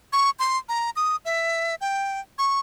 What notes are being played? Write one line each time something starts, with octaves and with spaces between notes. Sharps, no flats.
C#6
C6
A#5
D#6
E5
G5
C#6